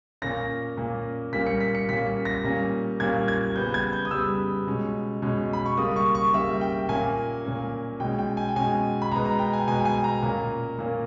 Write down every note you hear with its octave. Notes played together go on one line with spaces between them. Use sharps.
A#2 A#3 C#4 A#6
A#2 A#3 C#4
A#2 G3 A#3 C#4 B6
C#7
B6
C#7
A#2 G3 A#3 C#4 B6
A#6
A#2 G3 A#3 C#4
A#2 G3 A#3 C#4 G#6
G#6
C#3 G3 B3 G6
G#6
G6
D#6
C#3 G3 B3 E6
B2 G#3 C#4
B2 G#3 C#4
B5
C#6
C#3 G3 A#3 D#6
C#6
C#6
C#3 G3 A#3 E5
G5
A#2 A#3 C#4 G#5
A#2 A#3 C#4
B2 G#3 C#4 G5
G5
G#5
G5
B2 G#3 C#4 G#5
B5
B2 G#3 B3 A#5
A#5
G5
G#5
B2 G#3 B3 G#5
G5
G#5
A#5
A#2 A#3 C#4
A#2 A#3 C#4